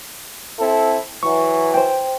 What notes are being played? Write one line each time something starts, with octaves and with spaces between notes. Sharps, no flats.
C4 E4 A4
E3 F#3 C#6
C5 G5